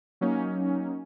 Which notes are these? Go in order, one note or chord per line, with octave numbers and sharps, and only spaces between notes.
F#3 A#3 C#4 D#4